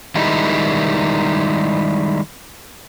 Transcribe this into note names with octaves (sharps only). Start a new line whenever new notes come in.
D#3 G3 G#3 D#4 E4